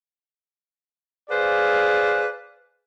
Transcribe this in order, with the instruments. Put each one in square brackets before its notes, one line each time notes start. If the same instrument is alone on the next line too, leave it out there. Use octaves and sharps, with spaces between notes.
[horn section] G#4 B4 C5 D5 F5